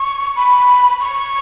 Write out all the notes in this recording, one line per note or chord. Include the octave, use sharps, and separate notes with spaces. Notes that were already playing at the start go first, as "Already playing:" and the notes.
Already playing: C#6
B5
C#6